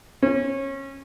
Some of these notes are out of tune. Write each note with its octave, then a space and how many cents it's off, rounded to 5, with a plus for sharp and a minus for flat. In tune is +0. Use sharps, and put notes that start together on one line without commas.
C#4 -25